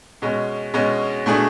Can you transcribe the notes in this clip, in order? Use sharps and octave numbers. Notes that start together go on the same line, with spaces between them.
B2 G#3 C#4
B2 G#3 C#4
B2 A3 D4 G#4